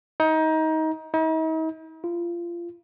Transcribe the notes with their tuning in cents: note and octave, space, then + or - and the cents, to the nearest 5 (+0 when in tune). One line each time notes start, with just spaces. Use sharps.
D#4 +25
D#4 +45
F4 -25